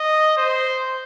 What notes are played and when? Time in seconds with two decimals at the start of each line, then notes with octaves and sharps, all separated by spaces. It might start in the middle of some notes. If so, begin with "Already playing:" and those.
Already playing: D#5
0.37 C5